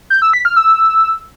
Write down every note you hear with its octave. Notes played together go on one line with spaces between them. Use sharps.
G6
E6
B6
F6
E6